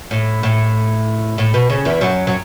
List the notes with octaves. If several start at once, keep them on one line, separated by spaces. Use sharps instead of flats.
A2
A2
A2
B2
C#3
E2 E3
F#2 F#3
F#3